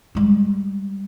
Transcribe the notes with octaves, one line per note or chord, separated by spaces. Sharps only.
G3 G#3